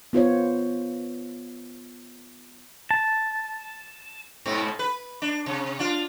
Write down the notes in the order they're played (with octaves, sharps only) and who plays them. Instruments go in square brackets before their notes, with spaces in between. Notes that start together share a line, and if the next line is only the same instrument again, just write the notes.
[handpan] B3 F4 C5 C#5
[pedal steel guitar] A5
[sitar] G#2 B2 C4
B4
D4
C3
D4 F4